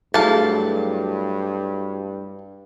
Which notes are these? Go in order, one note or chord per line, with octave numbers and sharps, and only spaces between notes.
G2 F#3 A3 E4 G#4 F5 A5